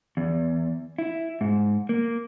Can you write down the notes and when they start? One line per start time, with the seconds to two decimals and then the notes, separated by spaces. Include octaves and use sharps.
0.17 E2
0.98 E4
1.41 G#2
1.89 A#3